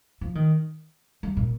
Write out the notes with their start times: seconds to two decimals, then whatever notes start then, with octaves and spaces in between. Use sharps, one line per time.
0.21 F3
0.35 D#3
1.23 G3
1.37 A#2